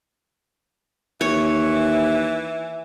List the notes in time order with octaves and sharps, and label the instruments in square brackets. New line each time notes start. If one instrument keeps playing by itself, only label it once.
[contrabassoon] D#2 [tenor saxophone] E3 [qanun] C#5